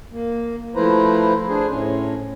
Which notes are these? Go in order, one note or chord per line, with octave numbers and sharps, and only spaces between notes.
A#3
F3 A3 E4 B4 C5 A#5
D4 G#4 C5
A2 C#4